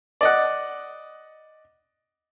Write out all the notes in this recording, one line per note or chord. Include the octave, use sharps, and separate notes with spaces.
D5 D#5 F#5